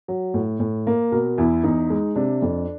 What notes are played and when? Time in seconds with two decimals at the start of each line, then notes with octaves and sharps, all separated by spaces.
0.08 F#3
0.34 A2
0.60 A2
0.87 A#3
1.12 B2 A#4
1.38 E2 E4
1.64 E2 D#4
1.90 G#3
2.16 C3 D4
2.42 F2